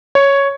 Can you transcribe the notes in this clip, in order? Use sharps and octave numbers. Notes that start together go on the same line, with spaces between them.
C#5